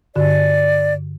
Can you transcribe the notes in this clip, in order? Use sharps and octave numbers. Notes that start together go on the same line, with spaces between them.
G2 D3 F#4 D5